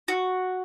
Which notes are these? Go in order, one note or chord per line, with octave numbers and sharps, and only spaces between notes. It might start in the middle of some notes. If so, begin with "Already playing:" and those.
F#4